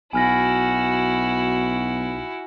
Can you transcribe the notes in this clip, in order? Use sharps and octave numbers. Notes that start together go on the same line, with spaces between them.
B1 E4 F#4 G#5 F6 A#6